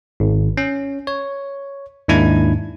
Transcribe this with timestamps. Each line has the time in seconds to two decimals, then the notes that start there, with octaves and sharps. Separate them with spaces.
0.20 G#1
0.57 C#4
1.07 C#5
2.08 D#2 G#2 D4 E4 G#6